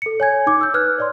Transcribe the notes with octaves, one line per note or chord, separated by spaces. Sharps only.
A4 C#7
C#5 G#5 G#6
D#4 D6
E6 G6
B4 F6 F#6 G#6
C#5 D5 C6